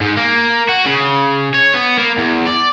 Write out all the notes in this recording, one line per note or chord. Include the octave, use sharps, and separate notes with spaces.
G#2
A#3
F#4
C#3
C#5
B3
A#3
E2
D5